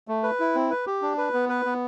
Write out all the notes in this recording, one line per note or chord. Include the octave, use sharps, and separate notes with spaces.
A3
B4
E4
C4
B4
G4
D4
B4
B3
B4
B3